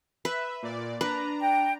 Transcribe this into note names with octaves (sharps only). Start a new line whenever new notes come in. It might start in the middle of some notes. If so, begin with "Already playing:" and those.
B4 E5
A#2 D5
D4 B4 A#5
G5